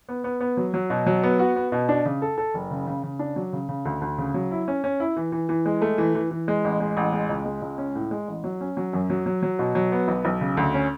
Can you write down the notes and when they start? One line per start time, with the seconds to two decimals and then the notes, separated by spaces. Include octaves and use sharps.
0.09 B3
0.24 B3
0.40 B3
0.57 F#3
0.74 F#3
0.90 B2
1.06 F#3
1.23 B3
1.39 F#4
1.56 B3
1.72 B2
1.89 D4
2.05 C#3
2.22 A4
2.38 A4
2.54 F#1
2.71 C#3
2.87 C#3
3.03 C#3
3.19 D4
3.36 F#3
3.53 C#3
3.69 C#3
3.85 D2
4.01 D2
4.18 C#3
4.34 F#3
4.51 E4
4.68 C#4
4.84 C#4
5.00 E4
5.17 E3
5.32 E3
5.49 E3
5.66 G#3
5.82 A3
5.98 E3
6.15 E3
6.31 E3
6.48 G#3
6.64 A1
6.80 G#3
6.97 A1
7.13 G#3
7.29 C#2
7.46 G#3
7.62 C#2
7.78 C#4
7.95 A2
8.11 G#3
8.28 A1
8.44 F#3
8.61 C#4
8.77 F#3
8.93 F#2
9.10 F#3
9.26 F#3
9.43 F#3
9.59 B2
9.75 F#3
9.92 B3
10.08 B1
10.25 B1
10.41 C#3
10.57 D2
10.74 C#4